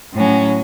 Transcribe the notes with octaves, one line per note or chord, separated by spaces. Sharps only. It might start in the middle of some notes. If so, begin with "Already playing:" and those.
A2 F#3 C#4